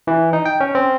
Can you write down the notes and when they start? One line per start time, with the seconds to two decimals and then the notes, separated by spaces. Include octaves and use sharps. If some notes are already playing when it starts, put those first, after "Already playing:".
0.07 E3
0.33 D#4
0.46 G5
0.60 C#4
0.75 C4